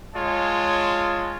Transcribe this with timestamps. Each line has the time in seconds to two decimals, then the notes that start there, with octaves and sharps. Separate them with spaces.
0.14 G#3 F4 C#5 A5